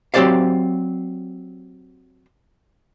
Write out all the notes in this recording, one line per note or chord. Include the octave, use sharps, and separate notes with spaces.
F#3 C4 G4 C5 D5 F5